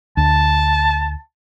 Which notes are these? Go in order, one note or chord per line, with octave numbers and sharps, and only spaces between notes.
D2 A5